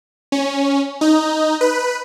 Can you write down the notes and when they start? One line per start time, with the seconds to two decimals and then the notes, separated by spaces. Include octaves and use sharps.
0.32 C#4
1.01 D#4
1.61 B4